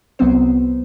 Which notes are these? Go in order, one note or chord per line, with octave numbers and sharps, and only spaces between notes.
C2 F#3 B3 C4 C5